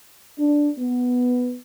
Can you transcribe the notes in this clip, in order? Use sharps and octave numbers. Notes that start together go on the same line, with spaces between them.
D4
B3